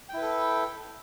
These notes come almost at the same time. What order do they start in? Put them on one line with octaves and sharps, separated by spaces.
G5 E4 B4 A4